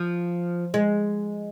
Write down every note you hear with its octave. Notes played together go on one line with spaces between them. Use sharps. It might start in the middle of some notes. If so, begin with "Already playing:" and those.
Already playing: F3
G#3